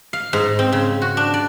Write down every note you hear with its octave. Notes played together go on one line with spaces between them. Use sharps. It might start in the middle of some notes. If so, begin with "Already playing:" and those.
F5
G#2
C4
C#3
F#4
D4
D5